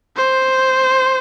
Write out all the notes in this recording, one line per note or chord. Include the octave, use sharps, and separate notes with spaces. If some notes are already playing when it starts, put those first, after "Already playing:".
C5